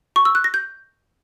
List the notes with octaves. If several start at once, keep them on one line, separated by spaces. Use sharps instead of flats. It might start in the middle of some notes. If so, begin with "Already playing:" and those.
C#6
E6
F#6
A#6
G6